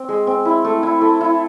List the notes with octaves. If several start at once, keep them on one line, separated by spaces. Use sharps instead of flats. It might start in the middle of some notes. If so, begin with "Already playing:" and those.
Already playing: C4
G#3
C4
E4
A3
E4
A3
E4